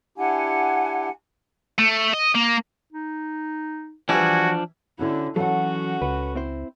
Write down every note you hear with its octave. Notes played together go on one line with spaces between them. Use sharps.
D4 E4 G4 F#5 G#5
A3
D#5
A#3
D#4
E3 F3 G3 D4 E4 F#4 G#5
D3 C#4 D4 E4 F#4
E3 F#3 C#4 F#4 A4 F#5
C#2 B4
C4 E4 C5